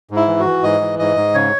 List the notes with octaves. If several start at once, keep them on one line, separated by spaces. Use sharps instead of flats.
G#2
E4
E3
F#4
E3
G#2 D#5
E3
G#2 D#5
G#2
C#3 C#5